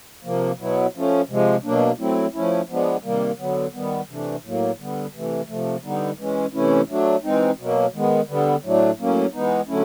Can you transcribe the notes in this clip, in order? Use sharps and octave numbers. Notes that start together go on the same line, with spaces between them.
C3 F3 A#3
B2 F#3 B3 E4
F3 A3 C#4
C3 F3 G#3
B2 F#3 A#3 D4
F#3 A3 C4 E4
F3 A3 C#4 E4
F3 G#3 B3 D4
C3 D#3 G3 A#3
D3 F#3 B3
D#3 G3 B3
C3 E3 A3 D4
A2 F#3 A#3
D3 G3 B3
C3 E3 A3
C3 F3 A3
D3 G3 B3 D#4
E3 G#3 C#4
C3 E3 A3 C#4 E4
F#3 A3 D4
E3 G#3 C4 D#4
B2 F#3 A#3
D#3 G#3 B3
D3 G3 B3
A2 F#3 A3 D4
A2 F#3 A#3 C#4
E3 G#3 B3 D#4
D3 F#3 A3 C#4 E4